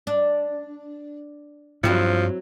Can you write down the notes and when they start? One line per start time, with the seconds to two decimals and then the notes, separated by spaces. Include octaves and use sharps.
0.07 D4
1.84 G2 F3 F#3 C4 E4